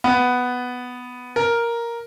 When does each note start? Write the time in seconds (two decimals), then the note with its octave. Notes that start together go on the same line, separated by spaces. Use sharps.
0.04 B3
1.36 A#4